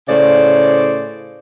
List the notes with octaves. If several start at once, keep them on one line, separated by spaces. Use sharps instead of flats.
A2 C#3 C5 D5